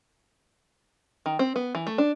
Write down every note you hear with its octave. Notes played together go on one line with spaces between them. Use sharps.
D#3
C4
B3
E3
A3
D4